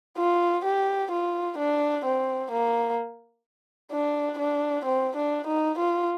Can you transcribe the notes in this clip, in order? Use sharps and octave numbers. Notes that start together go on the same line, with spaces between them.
F4
G4
F4
D4
C4
A#3
D4
D4
C4
D4
D#4
F4